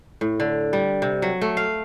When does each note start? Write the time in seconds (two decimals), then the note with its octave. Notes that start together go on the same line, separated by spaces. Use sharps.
0.21 A2
0.40 D3
0.73 G3
1.02 C3
1.22 F#3
1.41 A3
1.57 F5